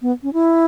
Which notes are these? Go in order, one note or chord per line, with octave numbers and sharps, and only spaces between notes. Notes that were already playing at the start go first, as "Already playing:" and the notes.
B3
C#4
E4